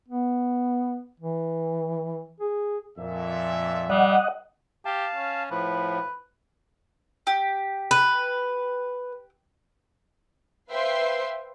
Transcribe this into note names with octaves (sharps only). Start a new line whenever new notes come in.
B3
E3
G#4
F2 A#2 E5
G3 D#5 F#5
G4 F5 A5
C#4
A2 F3 B4
G4
B4
B4 C5 E5 F5 G5 C6